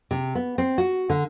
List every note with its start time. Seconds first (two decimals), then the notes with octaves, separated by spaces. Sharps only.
0.11 C3
0.35 B3
0.58 C4
0.78 F#4
1.10 D3